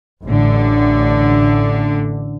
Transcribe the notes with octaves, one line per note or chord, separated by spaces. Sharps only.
A1 D3